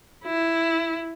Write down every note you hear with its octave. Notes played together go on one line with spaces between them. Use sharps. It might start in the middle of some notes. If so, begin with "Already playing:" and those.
E4